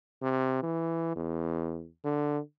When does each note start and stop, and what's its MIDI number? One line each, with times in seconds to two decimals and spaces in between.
0.22 0.58 48
0.63 1.13 52
1.16 1.88 40
2.05 2.39 50